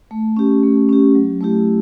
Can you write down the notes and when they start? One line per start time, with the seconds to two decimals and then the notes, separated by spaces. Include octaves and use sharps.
0.11 A3
0.37 C#4 G4
0.63 A3
0.89 C#4 G4
1.15 F#3
1.41 A3 E4 G4